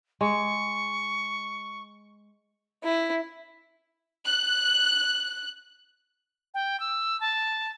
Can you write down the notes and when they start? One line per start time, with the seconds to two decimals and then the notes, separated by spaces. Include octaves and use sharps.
0.21 G#3 C#6
2.83 E4
4.25 F#6
6.54 G5
6.80 E6
7.20 A5